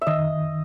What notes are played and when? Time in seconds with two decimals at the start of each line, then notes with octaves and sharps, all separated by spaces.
0.01 E5
0.07 D#3 D#5